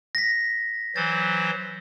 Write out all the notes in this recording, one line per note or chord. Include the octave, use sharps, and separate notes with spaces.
A#6 B6
E3 F#3 C5 A6